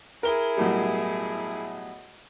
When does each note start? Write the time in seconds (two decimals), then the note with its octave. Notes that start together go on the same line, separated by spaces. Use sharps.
0.23 E4 G#4 A#4 G7
0.57 B1 A2 G3